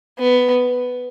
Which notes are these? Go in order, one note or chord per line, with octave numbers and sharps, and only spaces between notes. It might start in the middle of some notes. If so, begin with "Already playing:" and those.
B3